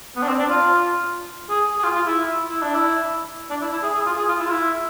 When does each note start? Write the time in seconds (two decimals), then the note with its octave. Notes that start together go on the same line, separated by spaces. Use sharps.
0.16 B3
0.23 D4
0.28 C4
0.39 D4
0.50 F4
1.50 G#4
1.79 G#4
1.84 F4
1.95 F4
2.06 E4
2.50 E4
2.62 D4
2.74 E4
3.50 D4
3.62 E4
3.72 E4
3.83 G#4
3.94 G#4
4.06 F4
4.18 G#4
4.29 F4
4.40 E4
4.46 F4
4.50 E4